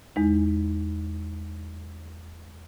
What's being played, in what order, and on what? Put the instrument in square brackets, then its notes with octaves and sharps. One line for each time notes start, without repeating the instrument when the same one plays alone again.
[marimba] E2 G#3 D#4